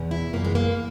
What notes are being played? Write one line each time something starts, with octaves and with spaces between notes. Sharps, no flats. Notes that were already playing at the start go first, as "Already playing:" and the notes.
Already playing: E2 B2
E4
F#2 E3 A#3
G#3
A#3